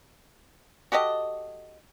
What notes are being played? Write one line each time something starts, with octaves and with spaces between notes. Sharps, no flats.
F#4 G4 A4 D#5